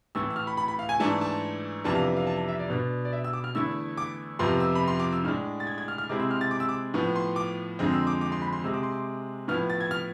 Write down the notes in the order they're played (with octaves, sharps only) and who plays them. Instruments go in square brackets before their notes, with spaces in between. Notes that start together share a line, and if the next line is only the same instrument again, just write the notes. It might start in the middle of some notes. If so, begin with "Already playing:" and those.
[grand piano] A2 E3 A3 E6
E6
F6
B5
B5
B5
F5
G#5
G#2 E3 A3 D4 A5
A5
F2 C3 E3 B3 D4 A5
F5
F5
A5
E5
D5
B2 B3 D4
D5
E5
E6
D6
F6
E2 D3 A3 E4 E6
D6
F2 C3 F3 B3 C6
E6
B5
C6
D6
E6
A2 G#3 D4 F6
A6
G#6
G#6
F6
F6
C3 G#3 C4 E4 D6
E6
F6
A6
D6
E6
D6
A2 F3 B3
C6
D6
F2 D3 G#3 C4
E6
D6
D6
C6
B5
C6
C3 G#3 C4 E6
D6
C6
D6
A2 F3 B3 E4 F6
A6
G#6
F6